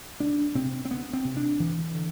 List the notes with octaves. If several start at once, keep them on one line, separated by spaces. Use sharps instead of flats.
D2 D4
C3 C4
C4
D2 B3
C4
C3
D4
D2 E3
D3